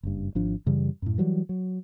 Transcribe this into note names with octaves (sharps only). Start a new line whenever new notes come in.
F#1 G2
G#1 F3 D4
F#2 C#3 E3 G3
F#2 A2
E3 F#3 G3
F#3